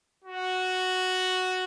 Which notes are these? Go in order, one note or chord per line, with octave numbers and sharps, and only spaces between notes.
F#4